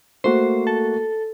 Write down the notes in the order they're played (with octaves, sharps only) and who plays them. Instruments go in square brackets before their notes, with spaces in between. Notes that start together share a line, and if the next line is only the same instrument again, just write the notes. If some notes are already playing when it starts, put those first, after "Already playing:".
[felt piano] A3 A#3 F#4 [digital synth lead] C5
[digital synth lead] A4